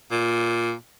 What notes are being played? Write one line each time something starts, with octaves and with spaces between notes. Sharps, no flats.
A#2